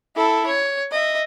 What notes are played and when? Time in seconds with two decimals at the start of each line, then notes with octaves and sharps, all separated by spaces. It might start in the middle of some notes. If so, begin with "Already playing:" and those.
0.16 E4 A4
0.47 C#5
0.92 D#5 E5